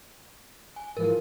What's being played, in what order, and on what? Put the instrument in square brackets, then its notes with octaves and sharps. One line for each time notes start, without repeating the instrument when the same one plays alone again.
[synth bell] G#5
[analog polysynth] G#2 E3 F3 [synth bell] A#4